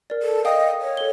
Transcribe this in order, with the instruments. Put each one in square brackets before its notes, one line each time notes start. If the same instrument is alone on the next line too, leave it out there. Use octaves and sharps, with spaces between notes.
[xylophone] A#4 D5
[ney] A4
[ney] D#5 [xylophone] F5 G5 D#6
[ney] C#5
[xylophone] A4 G7